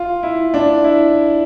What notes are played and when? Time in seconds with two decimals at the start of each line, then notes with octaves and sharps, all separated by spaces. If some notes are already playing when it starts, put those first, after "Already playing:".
Already playing: F4
0.23 E4
0.54 D4
0.84 E4